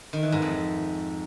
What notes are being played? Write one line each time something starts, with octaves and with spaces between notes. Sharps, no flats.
D#3
E3
G#2
F2